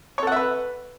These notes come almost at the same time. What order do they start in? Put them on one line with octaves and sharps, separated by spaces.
C#5 A4 F#5 E5 B4